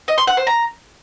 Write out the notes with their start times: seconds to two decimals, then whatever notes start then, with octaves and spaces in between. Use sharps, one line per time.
0.08 D#5
0.18 C6
0.27 F#5
0.37 C5
0.47 A#5